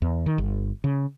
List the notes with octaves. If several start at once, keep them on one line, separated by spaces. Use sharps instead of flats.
E2
D#3
G1
C#3